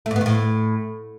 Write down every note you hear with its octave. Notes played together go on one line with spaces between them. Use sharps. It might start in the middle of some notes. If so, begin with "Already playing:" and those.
A3
G#2
B3
D#3
A2